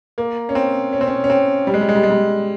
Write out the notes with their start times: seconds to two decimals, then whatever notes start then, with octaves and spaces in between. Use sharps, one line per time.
0.18 A#3
0.49 C#4
0.55 C4
0.93 C#4
1.01 C4
1.07 C#4
1.24 C#4
1.30 C4
1.67 G3
1.74 G#3
1.81 G3
1.89 G#3
1.95 G3
2.03 G#3
2.10 G3